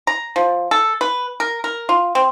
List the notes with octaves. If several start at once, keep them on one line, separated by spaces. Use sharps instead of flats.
A#5
F3
A4
B4
A#4
A#4
F4
C4